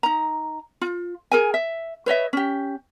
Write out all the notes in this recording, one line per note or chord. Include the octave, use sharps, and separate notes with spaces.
D#4 A#5
F4
G#4 A#4 G#5
E5
B4 C#5 D#5 E5
C#4 G4